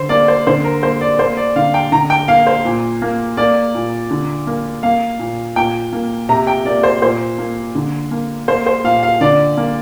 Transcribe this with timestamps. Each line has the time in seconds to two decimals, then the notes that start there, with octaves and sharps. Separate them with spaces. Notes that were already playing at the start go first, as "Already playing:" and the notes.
Already playing: D3 C5
0.09 A#3 D5
0.28 C5
0.47 D3 C5
0.64 A#4
0.83 A#3 C5
1.01 D5
1.19 A#3 C5
1.37 D5
1.56 D3 F5
1.74 G5
1.92 D3 A#5
2.10 G5
2.28 A#3 F5
2.47 C5
2.65 A#2
3.02 A#3
3.37 A#3 D5
3.75 A#2
4.11 D3
4.47 A#3
4.83 A#3 F5
5.19 A#2
5.56 A#2 G5
5.93 A#3
6.29 C3 A#5
6.47 G5
6.65 A#3 D5
6.83 C5
7.02 A#2 C5
7.38 A#3
7.75 D3
8.11 A#3
8.48 A#3 C5
8.66 C5
8.84 A#2 F5
9.03 F5
9.21 D3 D5
9.57 A#3